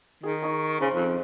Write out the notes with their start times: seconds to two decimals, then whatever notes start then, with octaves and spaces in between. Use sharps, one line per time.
0.23 D#3 G#4
0.42 D#4 C#6 D#6
0.81 C#3 C5 B5
0.94 F2